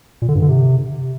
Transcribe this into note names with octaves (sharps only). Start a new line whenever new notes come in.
A#2
D3
G2
D3
C3